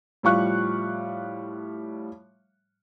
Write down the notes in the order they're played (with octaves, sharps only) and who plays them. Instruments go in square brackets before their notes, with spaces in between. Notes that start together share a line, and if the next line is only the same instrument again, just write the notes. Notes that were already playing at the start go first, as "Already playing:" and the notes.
[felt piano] A2 F3 G3 F5 C#6 F#6